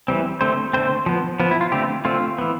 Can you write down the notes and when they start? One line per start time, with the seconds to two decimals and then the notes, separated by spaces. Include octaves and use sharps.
0.08 E3 G3 C4
0.41 D3 A3 C4 C5
0.73 D3 A3 C4 C5
1.06 F3 B3
1.40 F3 B3
1.51 E4
1.61 F4
1.72 D3 A3 C4 G4
2.05 D3 A3 C4 F4
2.38 E3 B3